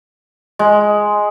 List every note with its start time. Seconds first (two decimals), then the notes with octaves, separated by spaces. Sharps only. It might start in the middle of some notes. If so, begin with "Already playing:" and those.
0.59 G#3